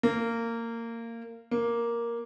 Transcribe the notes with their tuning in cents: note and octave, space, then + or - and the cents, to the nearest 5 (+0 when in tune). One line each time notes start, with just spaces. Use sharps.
A#3 -20
A#3 +5